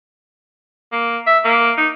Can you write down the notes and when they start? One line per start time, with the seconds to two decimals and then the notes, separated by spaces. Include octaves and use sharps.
0.92 A#3
1.27 E5
1.45 A#3
1.78 D#4